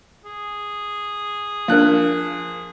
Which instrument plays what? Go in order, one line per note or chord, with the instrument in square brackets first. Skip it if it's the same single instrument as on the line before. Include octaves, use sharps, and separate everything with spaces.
[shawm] G#4
[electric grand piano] F3 F#6 [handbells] A#3 D4 A#4